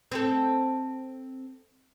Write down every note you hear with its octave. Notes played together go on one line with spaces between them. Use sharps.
C4 A4